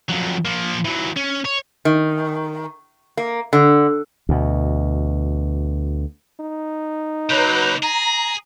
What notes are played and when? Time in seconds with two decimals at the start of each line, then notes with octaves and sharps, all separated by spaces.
0.09 F2 F#3
0.45 F3 A#3
0.85 E3 F#3
1.16 C#4
1.45 C#5
1.85 D#3
3.17 A#3
3.53 D3
4.29 D2 B2
6.40 D#4
7.30 C#3 F#3 A#3 B4 G6
7.83 G#4 A#5